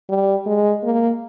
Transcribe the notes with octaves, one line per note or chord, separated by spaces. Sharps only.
G3
G#3
A#3